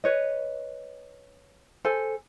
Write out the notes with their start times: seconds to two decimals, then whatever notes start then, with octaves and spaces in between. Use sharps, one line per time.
0.04 B4 C#5 D#5
1.85 A4 C5 G#5